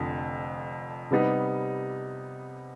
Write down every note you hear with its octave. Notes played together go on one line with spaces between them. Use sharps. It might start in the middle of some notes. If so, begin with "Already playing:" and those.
Already playing: F1 F2 D3
C3 G3 B3 D#4